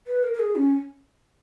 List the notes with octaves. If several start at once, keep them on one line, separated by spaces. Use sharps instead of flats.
B4
A#4
A#4
G#4
C#4